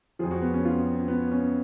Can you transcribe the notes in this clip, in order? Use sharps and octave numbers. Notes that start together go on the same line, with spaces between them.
F2 F3 G#4
F#4
B3
C#4
F4
B3
C#4